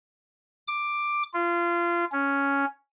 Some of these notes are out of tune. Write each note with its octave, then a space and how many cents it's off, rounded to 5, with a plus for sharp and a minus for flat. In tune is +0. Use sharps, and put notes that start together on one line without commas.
D6 +10
F4 -25
C#4 +5